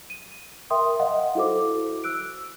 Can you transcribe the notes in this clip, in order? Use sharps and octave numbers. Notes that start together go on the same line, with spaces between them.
D#7
A#4 E5 G5 C6 D#6
D#5 F5 F#5
E4 F#4 A4 C5 D6
E6 F#6 D7